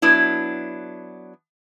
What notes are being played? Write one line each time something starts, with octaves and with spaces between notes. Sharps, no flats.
F#3 B3 D4 E4